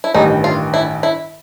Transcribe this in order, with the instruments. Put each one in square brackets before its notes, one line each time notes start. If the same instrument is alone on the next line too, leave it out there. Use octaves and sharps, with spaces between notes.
[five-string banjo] E4
[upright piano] A1 G2 D#3 G3 [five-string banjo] D#4
[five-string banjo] F4
E4
E4